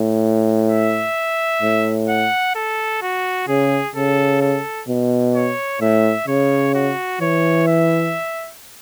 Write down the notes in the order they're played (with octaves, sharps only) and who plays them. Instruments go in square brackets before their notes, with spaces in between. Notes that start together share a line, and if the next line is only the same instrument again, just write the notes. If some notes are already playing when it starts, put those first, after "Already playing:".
Already playing: [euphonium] A2
[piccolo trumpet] E5
[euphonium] A2
[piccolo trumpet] F#5
A4
F#4
[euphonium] C#3 [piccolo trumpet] G#4
[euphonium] C#3 [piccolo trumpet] A4
[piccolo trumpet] A4
[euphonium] B2
[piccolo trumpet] C#5
[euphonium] A2 [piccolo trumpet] E5
[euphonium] C#3 [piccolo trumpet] C#5
[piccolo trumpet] F#4
[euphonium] E3 [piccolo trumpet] C#5
[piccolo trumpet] E5